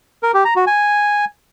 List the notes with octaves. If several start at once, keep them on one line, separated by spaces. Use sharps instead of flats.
A#4
G4
A#5
F#4
G#5